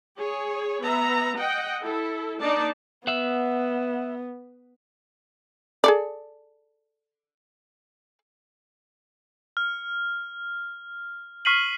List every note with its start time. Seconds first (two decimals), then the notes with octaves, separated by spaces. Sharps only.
0.17 G#4 C#5
0.83 B3 E5 A#5
1.36 D#5 F#5 G5
1.81 E4 A4
2.40 A#3 D4 D#4 D5 A5
3.07 B3 E5 F#5
5.84 G#4 A4 D5
9.57 F6
11.45 C#6 F6 B6 C7 D#7 F#7